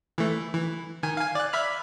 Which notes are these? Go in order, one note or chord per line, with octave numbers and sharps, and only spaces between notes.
E3 A3
E3
D#3 G#5
F5 G#5
D5 F#6
E5 B5 F6